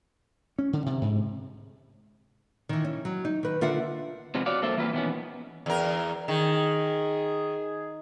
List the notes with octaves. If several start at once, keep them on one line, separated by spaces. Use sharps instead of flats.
C#4
D3
C3
G#2
D#3 E3
C#4
F#3
D#4
D#3 B4
D3 F4 A#4 E5 F#5
C3 F3 G#3 B3
F#4 C#5 D5 F5
G2 A#3 A4 C5 E5
E3 A#3 F4 G4 B4
B2 D#3 E3 A#3 B3 C#4
E2 A#4
D#3 G#4